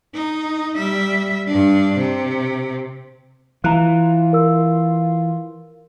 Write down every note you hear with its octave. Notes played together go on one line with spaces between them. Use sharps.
D#4
G3 E5
G2 D4
C3
E3 F4 A#5 F#6
A#4 E6